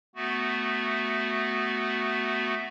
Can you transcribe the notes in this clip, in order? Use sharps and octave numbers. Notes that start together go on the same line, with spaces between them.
A3 B3 F#4